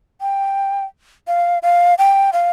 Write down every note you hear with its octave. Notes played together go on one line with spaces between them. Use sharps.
G5
F5
F5
G5
F5